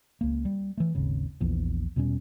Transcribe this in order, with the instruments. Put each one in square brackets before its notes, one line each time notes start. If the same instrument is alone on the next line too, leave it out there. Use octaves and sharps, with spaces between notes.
[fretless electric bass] C#2 A#3
G3
E3 A3
G#1 D#2 C#3
A#1 E2 E3 F3
E2 B2 G3 C#4